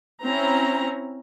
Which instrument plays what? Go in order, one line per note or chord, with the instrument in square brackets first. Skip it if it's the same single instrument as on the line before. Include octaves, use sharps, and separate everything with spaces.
[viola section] C4 C#4 E4 A#5